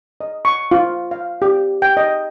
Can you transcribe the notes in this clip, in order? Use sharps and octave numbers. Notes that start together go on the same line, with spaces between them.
D#5
C#6
F4
F5
G4
G5
D#5